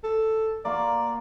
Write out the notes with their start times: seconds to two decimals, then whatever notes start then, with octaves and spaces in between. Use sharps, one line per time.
0.04 A4
0.65 A#3 F4 F#4 D5